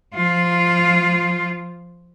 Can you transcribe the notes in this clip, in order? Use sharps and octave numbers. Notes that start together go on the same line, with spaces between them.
F3 F4